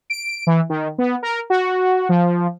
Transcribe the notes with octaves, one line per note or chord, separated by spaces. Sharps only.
D7
E3
D#3
B3
A#4
F#4
F3